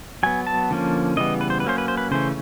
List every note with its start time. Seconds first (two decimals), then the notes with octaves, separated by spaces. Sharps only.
0.23 F#3 B3 G#5
0.47 A5
0.70 D3 F3 A#3 C#4
1.17 C#3 E3 G3 B3 D#5
1.41 B4
1.50 C5
1.60 B4
1.64 F#3 A#3 C#4 C5
1.78 B4
1.88 C5
1.97 B4
2.11 C#3 E3 A3 C#4 C5